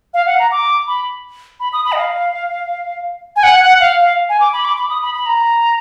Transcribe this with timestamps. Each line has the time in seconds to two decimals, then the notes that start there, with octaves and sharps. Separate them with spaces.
0.14 F5
0.26 F#5
0.39 A#5
0.51 D6
0.87 B5
1.60 B5
1.73 D#6
1.85 B5
1.92 D#5
1.97 F5
3.36 G#5
3.43 F#5
3.61 F#5
3.80 F5
3.99 F5
4.29 G#5
4.40 D6
4.53 B5
4.65 D6
4.78 B5
4.90 D#6
5.02 B5
5.14 B5
5.26 A#5